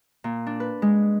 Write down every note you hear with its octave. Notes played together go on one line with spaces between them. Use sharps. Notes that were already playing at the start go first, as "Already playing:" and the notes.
A#2
D4
B4
G#3